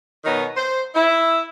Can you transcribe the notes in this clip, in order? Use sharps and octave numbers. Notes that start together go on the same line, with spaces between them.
B2 D#3 F#3 B3 D#4
C5
E4